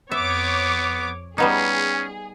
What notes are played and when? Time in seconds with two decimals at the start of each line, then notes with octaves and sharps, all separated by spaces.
0.11 F2 B3 C#5 E5 D6
1.38 G3 B3 C#4 D#4 G#4